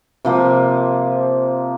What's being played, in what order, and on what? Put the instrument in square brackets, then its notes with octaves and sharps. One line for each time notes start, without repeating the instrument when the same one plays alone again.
[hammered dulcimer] C3 F3 A#3